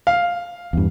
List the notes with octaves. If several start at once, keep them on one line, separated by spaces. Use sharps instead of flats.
F5
E2 G2